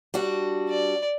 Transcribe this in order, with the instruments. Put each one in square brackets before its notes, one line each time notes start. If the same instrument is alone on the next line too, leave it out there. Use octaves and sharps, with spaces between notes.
[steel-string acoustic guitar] G3 D4 F#4
[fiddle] D5